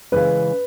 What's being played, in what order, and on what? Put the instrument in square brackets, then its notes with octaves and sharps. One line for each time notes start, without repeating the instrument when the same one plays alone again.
[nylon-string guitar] C#3 E3 G#3 [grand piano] B4